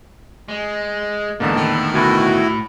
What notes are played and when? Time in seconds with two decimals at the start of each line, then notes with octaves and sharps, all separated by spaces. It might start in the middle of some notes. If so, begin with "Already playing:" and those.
0.49 G#3
1.40 E2 G#2 D3 A#3 A5
1.56 A2 D#3
1.94 D2 B2 E4 F#4